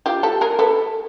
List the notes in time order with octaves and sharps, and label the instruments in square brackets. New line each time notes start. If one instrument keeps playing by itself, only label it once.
[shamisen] F4 G4
G4 A4
G#4 A#4
A4 B4